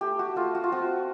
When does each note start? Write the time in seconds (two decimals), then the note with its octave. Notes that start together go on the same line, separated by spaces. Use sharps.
0.01 A3 G4
0.19 F#4
0.36 A3 F4
0.55 F#4
0.64 F4
0.72 C4 F#4